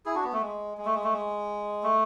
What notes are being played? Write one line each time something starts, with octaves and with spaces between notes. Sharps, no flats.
E4 G#4
D4 F#4
B3
A3
G#3
G#3
A3
G#3
A3
G#3
A3